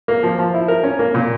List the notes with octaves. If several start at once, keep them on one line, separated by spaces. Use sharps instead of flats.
A#3
F3
F3
E4
A#4
C#4
A#3
A#2